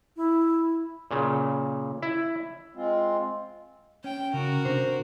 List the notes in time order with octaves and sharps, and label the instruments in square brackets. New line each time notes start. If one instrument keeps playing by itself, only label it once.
[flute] E4
[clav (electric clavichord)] A#2 C#3
E4
[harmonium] G#3 C4 F4
[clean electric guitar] C#4 [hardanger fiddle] G5
[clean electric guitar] C#3 [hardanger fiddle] F#4 A#4
[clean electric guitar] C3 D4 C5